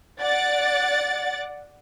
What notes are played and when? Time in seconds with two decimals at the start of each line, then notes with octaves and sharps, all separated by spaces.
0.21 D5 F#5 A6